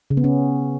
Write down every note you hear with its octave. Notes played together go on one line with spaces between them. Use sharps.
C#3
B3
C#4